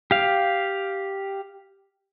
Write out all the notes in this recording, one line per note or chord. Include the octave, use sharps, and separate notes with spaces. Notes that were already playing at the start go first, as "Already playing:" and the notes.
G4 F5